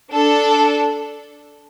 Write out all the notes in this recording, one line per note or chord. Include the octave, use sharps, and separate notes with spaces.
D4 A4